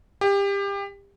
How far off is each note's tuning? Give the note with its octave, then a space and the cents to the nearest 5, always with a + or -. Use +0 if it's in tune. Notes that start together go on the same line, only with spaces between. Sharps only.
G4 +25